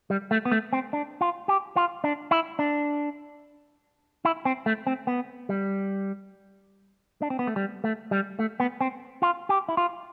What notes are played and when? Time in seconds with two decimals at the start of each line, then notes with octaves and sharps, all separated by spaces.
0.10 G3
0.31 A3
0.45 B3
0.52 A3
0.73 C4
0.93 D4
1.21 F4
1.48 G4
1.76 F4
2.04 D4
2.31 E4
2.59 D4
4.25 E4
4.45 C4
4.66 A3
4.87 C4
5.07 B3
5.49 G3
7.22 D4
7.30 C4
7.39 B3
7.47 A3
7.56 G3
7.84 A3
8.11 G3
8.39 A3
8.60 B3
8.81 C4
9.22 F4
9.49 G4
9.69 E4
9.77 F4